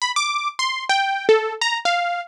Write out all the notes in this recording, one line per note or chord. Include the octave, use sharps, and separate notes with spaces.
B5
D6
C6
G5
A4
A#5
F5